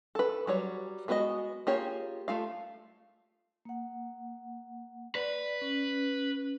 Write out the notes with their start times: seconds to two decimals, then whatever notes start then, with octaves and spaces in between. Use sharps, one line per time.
0.15 A4 B4
0.47 F#3 G3 C#5
1.08 G#3 B3 F#4 A4 D#5
1.67 A#3 F4 G4 G#4 C#5
2.28 A3 F4 F5
3.65 A#3 F#5
5.15 B4 D5
5.62 C#4